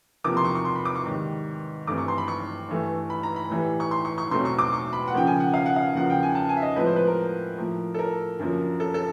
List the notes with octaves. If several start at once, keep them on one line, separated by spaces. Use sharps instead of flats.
E2 C3 F3 A#3 D6
C6
C#6
C#6
C6
B5
D6
C#6
G#2 D#3 G3
G2 E3 A3 C4 D6
C#6
C6
B5
C#6
G2 E3 A3
B5
A#5
B5
A2 E3 G3
C#6
C6
C#6
C#6
E2 B2 F#3 A3 C4 C6
C#6
D6
C#6
B5
F#5
C#3 F3 A#3 G5
G#5
F#5
F5
F#5
F5
E2 C#3 F3 A#3 F#5
G5
G#5
A5
G#5
E5
D#5
A2 F3 G#3 C4 B4
C5
B4
A#4
A2 F3 A#3
A4
A#4
F#2 D3 F3 A#3
A4
A4